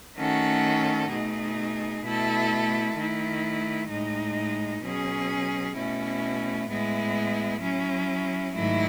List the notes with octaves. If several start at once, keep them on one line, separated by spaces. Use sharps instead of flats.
D#3 A3 C#4 F#4 A4
B2 A3 D#4 G#4
B2 A3 E4 A4
D#3 A3 E4
A2 G#3 D#4
B2 F#3 C#4 G#4
B2 A3 C#4 E4
A2 G#3 B3 E4
F#3 C#4 E4
G#2 D#3 F#3 A3 E4